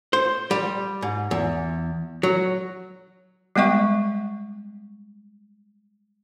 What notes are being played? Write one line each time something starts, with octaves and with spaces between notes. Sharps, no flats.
C5
G3
G#2
E2
F#3
G3 G#3 B3 D#5 G5 C#6